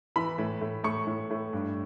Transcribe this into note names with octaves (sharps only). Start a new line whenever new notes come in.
E3 B5
A2
A2
A2 C#6
A2
A2
G2